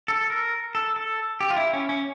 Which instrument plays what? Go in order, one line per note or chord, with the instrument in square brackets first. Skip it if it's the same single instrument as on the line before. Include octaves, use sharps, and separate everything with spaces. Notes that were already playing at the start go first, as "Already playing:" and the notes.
[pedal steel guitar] A4
A#4
A4
A4
G4
F4
E4
C#4
C#4